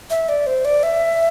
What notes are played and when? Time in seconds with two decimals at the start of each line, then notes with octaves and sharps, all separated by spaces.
0.10 E5
0.29 D5
0.47 C5
0.65 D5
0.83 E5